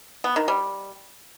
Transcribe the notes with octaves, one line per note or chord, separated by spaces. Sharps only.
B3
D#3
G3